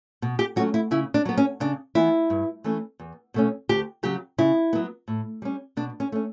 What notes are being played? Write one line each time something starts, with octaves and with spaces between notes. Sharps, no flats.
B2
G4
F#3 A3 C#4 F#4
E4
C#3 E4
D4
F#3 B3
C#4
C#3 D4
E3 B3 E4
G2
E3 A3 C#4
E2
B2 A3 C#4
D2 G4
C#3 F#3 G4
C#3 E4
F#3 B3
A2
G3 C#4
B2 D4
C#4
A3 C#4